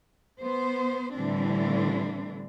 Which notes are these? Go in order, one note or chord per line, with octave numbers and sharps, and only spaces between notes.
B3 C5
A2 D3 E3 G3 C4 D4